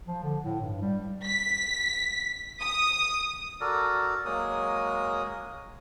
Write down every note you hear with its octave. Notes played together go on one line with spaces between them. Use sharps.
F3
D3
A2
G2
G3
B6
D#6
F#4 A4 A#4 D5
F#3 G#3 A#3 D#6